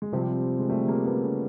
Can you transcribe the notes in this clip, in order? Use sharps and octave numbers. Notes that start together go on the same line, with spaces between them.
G#3
C3 F3 G3
G#3
G3 A3
G#3 A#3
A3 B3
C#3